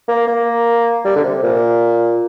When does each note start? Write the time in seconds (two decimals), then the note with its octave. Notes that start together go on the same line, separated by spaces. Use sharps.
0.08 A#3
0.27 A#3
1.05 G3
1.16 D3
1.24 C3
1.43 A#2